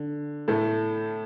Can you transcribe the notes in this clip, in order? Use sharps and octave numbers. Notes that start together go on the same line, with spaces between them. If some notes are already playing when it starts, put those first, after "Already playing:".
Already playing: D3
A2 A3